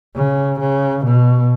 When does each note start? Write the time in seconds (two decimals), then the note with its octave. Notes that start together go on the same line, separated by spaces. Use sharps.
0.15 C#3
0.60 C#3
1.05 B2